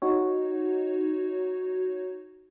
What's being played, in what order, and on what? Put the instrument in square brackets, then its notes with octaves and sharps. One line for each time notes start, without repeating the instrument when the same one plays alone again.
[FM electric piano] D#4 F#4 C#5